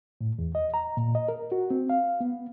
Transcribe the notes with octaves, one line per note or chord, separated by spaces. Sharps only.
A2
E2
D#5
A#5
A#2
D#5
A#4
F#4
C4
F5
B3